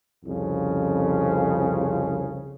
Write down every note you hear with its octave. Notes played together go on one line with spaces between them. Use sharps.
C2 F2 C#3